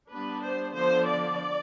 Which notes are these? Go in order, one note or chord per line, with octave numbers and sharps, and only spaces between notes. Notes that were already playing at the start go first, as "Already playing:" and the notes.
G3 B3 D4 B4
C5
D3 F3 B3 D4 C5
D5